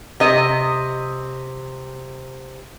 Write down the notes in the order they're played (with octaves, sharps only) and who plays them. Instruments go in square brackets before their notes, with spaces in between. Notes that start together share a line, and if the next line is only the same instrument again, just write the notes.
[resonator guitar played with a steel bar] C3 D#5